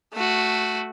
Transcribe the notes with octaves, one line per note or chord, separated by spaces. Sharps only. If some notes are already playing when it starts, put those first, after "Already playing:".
A3 F#4